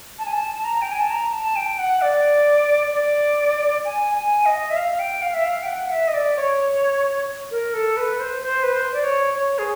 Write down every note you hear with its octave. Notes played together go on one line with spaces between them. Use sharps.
A5
G#5
A5
A#5
G5
G#5
A5
A#5
A5
G5
F#5
D5
D5
G#5
G#5
D#5
E5
F5
G5
F5
E5
F5
G5
F#5
E5
D#5
D5
C#5
A#4
A4
B4
C5
C5
B4
C5
D5
C#5
C#5
G#4